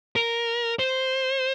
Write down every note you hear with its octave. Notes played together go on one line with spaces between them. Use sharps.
A#4
C5